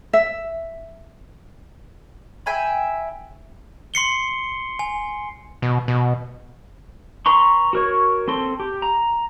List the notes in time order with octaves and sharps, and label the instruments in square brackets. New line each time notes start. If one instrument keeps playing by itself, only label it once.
[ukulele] E5
[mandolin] E5 G5 G#5 B5
[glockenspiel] C6 C7 C#7 G7
G#5
[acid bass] B2
B2
[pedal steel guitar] B4 A#5 C6 C#6
F#4 A#4 C#5
C4 A4 C6
G4
A#5